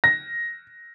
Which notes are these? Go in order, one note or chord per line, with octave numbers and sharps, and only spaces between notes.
A#6